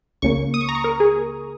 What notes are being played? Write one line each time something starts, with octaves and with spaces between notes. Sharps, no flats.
C#2 C#3 A#3 C#6
D#6
C#6
A#5
C#6
A#4
G#4